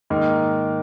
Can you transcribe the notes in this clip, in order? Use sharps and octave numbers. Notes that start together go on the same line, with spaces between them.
G#2 D#3 A#3 D#4